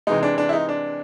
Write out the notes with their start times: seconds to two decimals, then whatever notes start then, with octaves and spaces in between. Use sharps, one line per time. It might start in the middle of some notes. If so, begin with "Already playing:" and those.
0.07 C3 E3 G#3 D#4
0.23 D4
0.38 D4
0.49 E4
0.53 D#4
0.69 D4